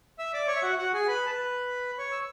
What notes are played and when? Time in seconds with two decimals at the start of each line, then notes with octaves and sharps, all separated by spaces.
0.19 E5 E6
0.34 D5 D6
0.48 C#5 C#6
0.56 E5
0.63 F#4 F#5
0.78 F#4 F#5
0.94 G#4 G#5
1.08 B4 B5
1.26 A5
1.30 B4 B5
1.98 C#5 C#6
2.12 E6